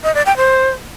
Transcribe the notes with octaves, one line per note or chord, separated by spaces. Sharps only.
D#5
D5
G5
C5